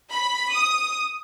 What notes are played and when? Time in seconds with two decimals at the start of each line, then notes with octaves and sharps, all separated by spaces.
0.12 B5
0.53 D#6